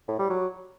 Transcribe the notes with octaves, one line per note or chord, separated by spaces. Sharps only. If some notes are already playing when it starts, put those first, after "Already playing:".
A2
G3
F#3